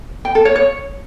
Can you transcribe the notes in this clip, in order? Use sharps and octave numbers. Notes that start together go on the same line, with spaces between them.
G5
A4
C#5
C#5